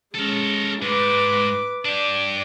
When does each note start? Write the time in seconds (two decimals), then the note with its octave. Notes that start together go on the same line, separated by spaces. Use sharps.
0.14 G#3 C#4 A4 A#4
0.82 G#2 G#3 B4 D6
1.85 D4 G4 D5